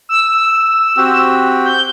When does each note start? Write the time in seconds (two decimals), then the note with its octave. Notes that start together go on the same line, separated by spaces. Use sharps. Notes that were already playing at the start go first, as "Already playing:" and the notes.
0.09 E6
0.97 C4 F#4 G4
1.65 G6